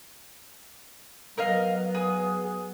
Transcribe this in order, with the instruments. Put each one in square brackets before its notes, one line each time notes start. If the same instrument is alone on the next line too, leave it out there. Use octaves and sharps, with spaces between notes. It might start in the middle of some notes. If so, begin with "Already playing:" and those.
[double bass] F#3 B3 [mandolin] A#4 D#5 F5
[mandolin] G#4 G#5